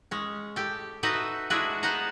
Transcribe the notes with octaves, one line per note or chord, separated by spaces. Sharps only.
G#3 C#4
G4 A4
D#4 F#4 A4 B4 D#5 E5
G#3 D4 E4 F#4 G#4 B4
B3 C5 D#5 F5 F#5 A#5